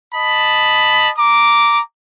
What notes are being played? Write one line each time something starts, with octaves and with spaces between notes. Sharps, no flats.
D#5 A5 B5
A#5 D6